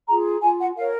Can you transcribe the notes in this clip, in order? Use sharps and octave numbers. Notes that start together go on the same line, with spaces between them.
F4 G#4 A#5
F4 G#5
F#5
A#4 C#5 F5